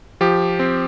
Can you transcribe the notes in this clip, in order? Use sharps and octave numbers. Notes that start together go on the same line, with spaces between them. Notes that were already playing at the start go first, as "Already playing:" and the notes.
F3 G4
C4